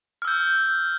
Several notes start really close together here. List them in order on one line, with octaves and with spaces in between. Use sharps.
F6 E6 G6